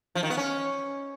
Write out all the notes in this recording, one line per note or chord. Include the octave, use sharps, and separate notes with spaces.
F3
D#3
B3
C#4